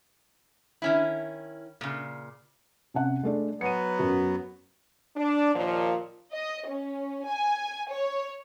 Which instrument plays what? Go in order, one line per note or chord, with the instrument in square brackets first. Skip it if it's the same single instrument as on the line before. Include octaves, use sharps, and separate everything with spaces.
[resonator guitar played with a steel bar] D#3 C#4 E4
A#2 C#3
[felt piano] C3 C#4 F#5
G#3 A3 D4
[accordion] F#3 B3 [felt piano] C#7 D#7
[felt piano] F#2 F#4
[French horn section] D4
D#2 A#2 F3
[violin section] D#5
C#4
G#5
C#5